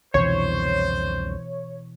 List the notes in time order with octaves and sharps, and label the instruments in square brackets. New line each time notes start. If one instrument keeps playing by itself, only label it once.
[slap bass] C2 F2 D3 [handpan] B2 E3 [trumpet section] C5 [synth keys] C#5